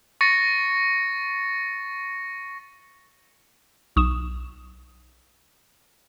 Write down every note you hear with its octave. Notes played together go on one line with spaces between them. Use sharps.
C#6 A6 A#6 C#7
B1 C#6 D#6 E7